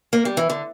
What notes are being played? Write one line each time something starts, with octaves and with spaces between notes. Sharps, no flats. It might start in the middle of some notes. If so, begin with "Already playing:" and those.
A#3
G3
E3
D3